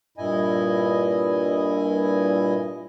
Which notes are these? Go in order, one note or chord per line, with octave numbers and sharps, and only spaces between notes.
G2 A#2 E4 D#5 G#5